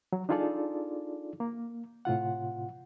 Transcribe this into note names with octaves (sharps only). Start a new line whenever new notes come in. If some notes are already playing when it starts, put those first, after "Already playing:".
F#3
D4 D#4 F4 G#4 A4 D5
A#3
A2 C3 F4 F#5